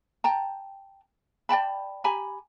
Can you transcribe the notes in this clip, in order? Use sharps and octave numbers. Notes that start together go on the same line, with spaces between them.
G5 A5 A#5
D5 G5 A5 B5
G4 G#5 A#5 B5